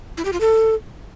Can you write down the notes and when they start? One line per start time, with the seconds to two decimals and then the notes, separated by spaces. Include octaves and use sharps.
0.17 E4
0.25 G4
0.33 F4
0.41 A4